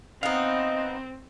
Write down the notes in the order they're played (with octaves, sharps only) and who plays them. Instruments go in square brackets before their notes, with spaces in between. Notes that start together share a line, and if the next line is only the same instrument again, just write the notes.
[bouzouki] B3 D#4 [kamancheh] C4 [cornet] D#5 [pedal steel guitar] F5 F#5